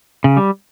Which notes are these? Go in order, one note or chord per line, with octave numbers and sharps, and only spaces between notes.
C#3
G3